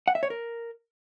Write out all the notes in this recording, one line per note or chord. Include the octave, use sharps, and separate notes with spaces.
F#5
E5
C#5
A#4